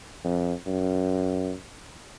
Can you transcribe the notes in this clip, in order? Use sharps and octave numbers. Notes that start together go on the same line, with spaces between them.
F2
F#2